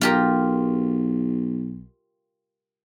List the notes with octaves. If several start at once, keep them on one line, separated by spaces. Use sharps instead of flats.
B1 F4 G4 A#4